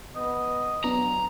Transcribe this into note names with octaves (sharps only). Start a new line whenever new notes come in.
B3 D#5
F#3 B3 D4 A#5